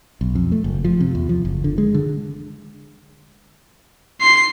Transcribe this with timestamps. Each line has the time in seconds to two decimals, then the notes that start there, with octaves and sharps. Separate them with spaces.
0.21 B1
0.35 F2
0.52 A3
0.64 F#1
0.84 F3
1.00 C3
1.15 E2
1.29 F3
1.45 F#1
1.64 D3
1.78 G#3
1.94 D3
4.21 C6 C7